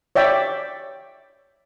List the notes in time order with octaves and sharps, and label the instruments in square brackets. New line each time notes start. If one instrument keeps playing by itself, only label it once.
[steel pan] C#5 D5 E5 G5 D6